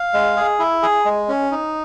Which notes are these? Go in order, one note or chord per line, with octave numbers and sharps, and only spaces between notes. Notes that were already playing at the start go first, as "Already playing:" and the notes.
Already playing: F5
G#3
G#4
E4
G#4
G#3
C#4
D#4